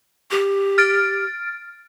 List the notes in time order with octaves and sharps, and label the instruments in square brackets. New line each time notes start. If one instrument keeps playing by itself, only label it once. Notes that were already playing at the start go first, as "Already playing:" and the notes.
[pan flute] G4
[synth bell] F6 A6 D7